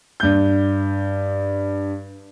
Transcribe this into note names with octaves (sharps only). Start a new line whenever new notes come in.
G2 G6